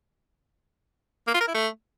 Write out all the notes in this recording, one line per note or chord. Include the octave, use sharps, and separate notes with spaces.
A#3
F4
A#4
E4
A3